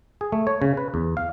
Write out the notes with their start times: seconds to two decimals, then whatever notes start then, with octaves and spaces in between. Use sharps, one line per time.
0.21 G#4
0.32 A3
0.47 C#5
0.62 C#3
0.77 B4
0.94 E2
1.17 F5